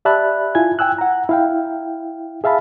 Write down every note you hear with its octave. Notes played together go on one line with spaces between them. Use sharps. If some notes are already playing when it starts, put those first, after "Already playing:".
G4 D5 E5 A5 B5 F#6
E4 F4 G#5 G#6
G5 G#5 E6 F#6
F#5 A#5
E4 F5 G5
G#4 E5 F5 A5 B5